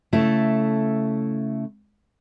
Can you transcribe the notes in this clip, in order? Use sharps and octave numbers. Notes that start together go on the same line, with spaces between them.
C#3 A3 E4 A4